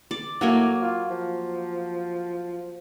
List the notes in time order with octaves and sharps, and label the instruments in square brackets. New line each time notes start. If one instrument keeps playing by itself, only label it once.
[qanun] D5
[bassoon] A2 [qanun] F#3 A#3 G#5
[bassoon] F4
F3